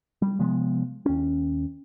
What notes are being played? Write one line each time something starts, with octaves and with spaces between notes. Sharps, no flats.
G3
C3 F3 G#3 B3
D#2 C#4